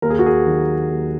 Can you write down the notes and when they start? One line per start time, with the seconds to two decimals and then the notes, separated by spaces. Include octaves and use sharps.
0.02 D#2 A#4
0.10 G#4
0.19 F#4
0.26 G#4
0.46 D#3 F#3
0.90 D#2